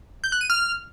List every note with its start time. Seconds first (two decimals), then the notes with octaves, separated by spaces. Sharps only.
0.24 G6
0.32 F#6
0.41 D#7
0.50 F6